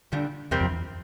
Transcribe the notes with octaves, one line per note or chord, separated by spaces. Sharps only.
A#2 D3 G3 D4
E2 C3 G3 C4 G4 A#4
F2
E2